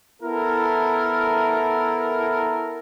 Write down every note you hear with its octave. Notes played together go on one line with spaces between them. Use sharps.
B3 E4 A4 A#4